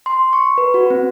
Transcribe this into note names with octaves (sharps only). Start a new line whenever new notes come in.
C6
C#6
B4
F#4
C4